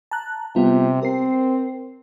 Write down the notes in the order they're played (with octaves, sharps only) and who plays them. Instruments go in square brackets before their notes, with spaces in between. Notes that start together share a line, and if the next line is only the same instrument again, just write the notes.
[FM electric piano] A5 A#5 F#6
[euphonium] C3 [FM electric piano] G3 B3 F4
[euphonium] C4 [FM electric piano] A#4 C7